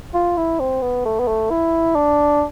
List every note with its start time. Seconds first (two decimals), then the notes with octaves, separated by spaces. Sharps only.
0.14 F4
0.37 E4
0.60 C4
0.82 B3
1.05 A3
1.20 B3
1.28 A3
1.50 E4
1.95 D4